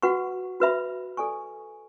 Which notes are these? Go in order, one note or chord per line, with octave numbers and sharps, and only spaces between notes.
F#4 B4 F#5 C#6
F#4 B4 E5 B5
A4 D5 G#5 C#6